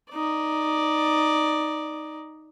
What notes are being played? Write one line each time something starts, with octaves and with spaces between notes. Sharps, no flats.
D#4 D5